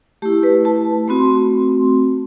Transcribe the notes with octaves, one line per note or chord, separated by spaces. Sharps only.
A3 E4 G4
B4
A5
A3 C4 F#4 B5
C6